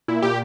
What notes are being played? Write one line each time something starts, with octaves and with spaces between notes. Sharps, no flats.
A#2 E4
A#2 G4